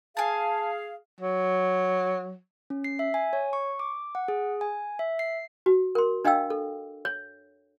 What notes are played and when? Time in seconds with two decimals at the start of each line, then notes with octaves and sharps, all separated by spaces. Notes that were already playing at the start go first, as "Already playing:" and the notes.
0.17 G#4 F5 G#5 A5
1.20 F#3
2.70 C#4
2.84 C7
2.99 E5
3.14 G#5
3.33 C#5
3.53 C#6
3.79 D6
4.15 F#5
4.28 G#4
4.61 G#5
4.99 E5
5.19 C7
5.66 F#4
5.95 A#4 C6
6.25 D4 D#5 F5 G5 E6
6.50 A4
7.05 C#5